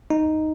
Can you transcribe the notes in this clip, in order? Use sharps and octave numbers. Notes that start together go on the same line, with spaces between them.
D#4